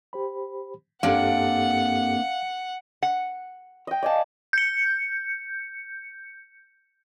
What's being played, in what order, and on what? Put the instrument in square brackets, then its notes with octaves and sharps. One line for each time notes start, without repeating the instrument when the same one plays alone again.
[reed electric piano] G4 C5 B5
[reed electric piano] G2 G4 A4 [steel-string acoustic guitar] A#3 C4 D4 [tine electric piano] F5 [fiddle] F#5
[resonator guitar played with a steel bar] F#5
[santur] D#5 G5
[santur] D5 G#5 A5 [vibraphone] D#5 F5
[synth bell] G6 C#7